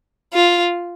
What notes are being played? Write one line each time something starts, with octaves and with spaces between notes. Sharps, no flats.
F4